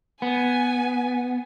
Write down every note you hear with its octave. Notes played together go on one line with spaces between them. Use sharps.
B3 G#5